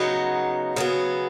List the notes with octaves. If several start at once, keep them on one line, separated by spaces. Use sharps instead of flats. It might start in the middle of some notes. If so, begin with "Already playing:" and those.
Already playing: C#3 F#3 B3 D#4
C#3 F#3 B3 G#4